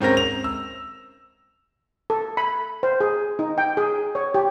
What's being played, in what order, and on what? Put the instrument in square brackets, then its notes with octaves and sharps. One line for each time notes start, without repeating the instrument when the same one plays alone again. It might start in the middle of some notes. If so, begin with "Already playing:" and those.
[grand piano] G#2 C4 C#4 A#4 A#6
F7
E6
[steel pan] A4
B5
C5
G#4
D#4
G5
G#4
C#5
G4